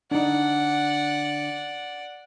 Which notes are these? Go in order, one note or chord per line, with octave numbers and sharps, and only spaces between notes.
D3 D4 D#4 D5 F#5